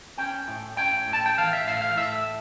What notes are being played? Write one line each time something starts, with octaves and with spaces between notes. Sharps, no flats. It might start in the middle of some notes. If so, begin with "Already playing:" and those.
C#4 G5
A2
C#4 G5
A2
A5
G5
E3 F5
E5
A2 F5
F5
A2 E5